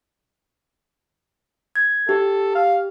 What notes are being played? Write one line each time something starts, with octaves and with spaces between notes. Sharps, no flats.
G#6
G4 A4
F5